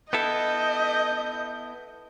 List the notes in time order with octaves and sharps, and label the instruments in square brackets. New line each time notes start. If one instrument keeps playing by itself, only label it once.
[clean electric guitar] B3 E4 A4 [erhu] D#5 [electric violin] G6